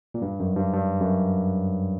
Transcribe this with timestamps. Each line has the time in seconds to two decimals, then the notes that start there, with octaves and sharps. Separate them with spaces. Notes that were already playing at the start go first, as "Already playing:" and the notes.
0.14 A#2
0.22 G2
0.40 F#2
0.57 G2
0.74 G2
1.00 F#2